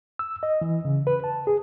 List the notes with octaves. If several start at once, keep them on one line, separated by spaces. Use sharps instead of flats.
E6
D#5
E3
C#3
B4
A5
G#4